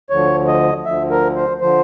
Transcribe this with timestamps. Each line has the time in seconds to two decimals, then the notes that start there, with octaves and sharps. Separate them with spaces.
0.10 D2 D3 F3 C#5
0.47 D#5
0.85 D2 D3 F3 E5
1.10 A#4
1.36 C5
1.61 D3 F3 C5